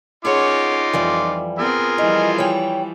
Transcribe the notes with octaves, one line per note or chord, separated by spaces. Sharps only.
C#4 D#4 F4 G#4 C#5 F#5 D6
F2 E3 F3 G3
B3 C4 F4 G#4 A#4
E3 F3 G3 D#5
C#5 G5